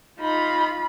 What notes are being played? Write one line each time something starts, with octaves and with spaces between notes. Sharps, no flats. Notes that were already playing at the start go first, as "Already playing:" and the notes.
D#4 F4 B5